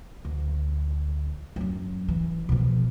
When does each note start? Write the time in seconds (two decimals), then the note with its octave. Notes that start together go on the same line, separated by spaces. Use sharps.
0.25 D2
1.56 F#2 F#3
2.08 E3
2.49 B2 F3